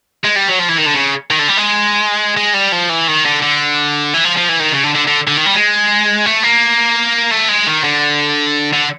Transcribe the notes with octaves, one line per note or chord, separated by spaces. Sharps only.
G#3
G3
F#3
F3
E3
D#3
D3
C#3
D#3
D3
G3
G#3
G#3
G3
F3
E3
D#3
D3
D3
E3
F3
F3
E3
D#3
C#3
D3
D3
D3
D3
D#3
G3
G#3
A3
A#3
A3
G#3
D#3
D3
D3